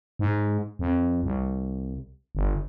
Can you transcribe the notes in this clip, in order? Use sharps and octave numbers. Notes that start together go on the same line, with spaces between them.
G#2
F2
C2
G1